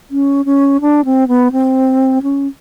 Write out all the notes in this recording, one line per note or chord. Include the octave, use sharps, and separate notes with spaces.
C#4
C#4
D4
C4
B3
C4
C#4